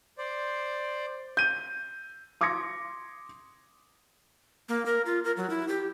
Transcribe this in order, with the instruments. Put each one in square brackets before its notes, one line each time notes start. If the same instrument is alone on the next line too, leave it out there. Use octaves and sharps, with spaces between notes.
[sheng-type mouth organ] C5 D5
[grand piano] G6 D#7
[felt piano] C6 D6 D#6 G#6 A#6 C#7
[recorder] A#3
A#4
F4
A#4
F#3
E4
G4